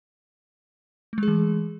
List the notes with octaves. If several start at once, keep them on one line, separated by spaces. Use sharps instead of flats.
E3 G#3 A3 G#4